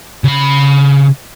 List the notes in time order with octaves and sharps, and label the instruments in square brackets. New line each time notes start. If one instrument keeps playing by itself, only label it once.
[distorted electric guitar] C#3 B5